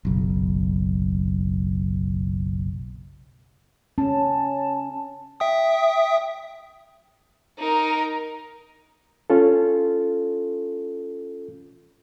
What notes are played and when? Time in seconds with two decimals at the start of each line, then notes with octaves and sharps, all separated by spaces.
0.05 F#1 B1
3.98 C#4 A5
5.40 E5 G5 D#6
7.58 D#4 A#4
9.30 C#4 F4 A4